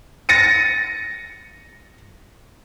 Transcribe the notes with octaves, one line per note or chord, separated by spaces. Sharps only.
A6 A#6 C#7 D#7